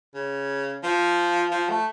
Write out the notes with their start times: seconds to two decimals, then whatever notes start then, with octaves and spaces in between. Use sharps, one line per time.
0.15 C#3
0.83 F3
1.51 F3
1.69 A3